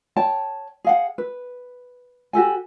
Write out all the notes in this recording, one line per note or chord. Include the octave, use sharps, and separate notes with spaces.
C#5 G5 A5
G#4 F5 F#5
B4
F#4 G4 A4 G#5